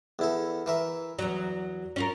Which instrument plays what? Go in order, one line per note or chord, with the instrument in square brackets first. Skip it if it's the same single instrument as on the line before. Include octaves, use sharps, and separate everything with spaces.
[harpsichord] E2 E4 A4
E3 A#4 E5
[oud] E2 F#3 [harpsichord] A#5
[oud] C#4 F4 A#4